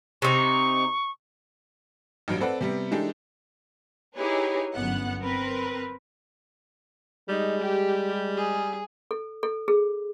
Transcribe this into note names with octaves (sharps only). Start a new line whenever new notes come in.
C3 D#4 C#6
A1 G2 F#3 D7
C4 A4 B4 D5 F#5
C3 G3 B3
E3 G#3 D4 D#4 G4 A4
D#4 E4 G4 G#4 B4 C#5
G1 F#2 B3 F#5
C4 A#4 B4
G3 G#3 D#4
G4
G#4
A4
A4
G#4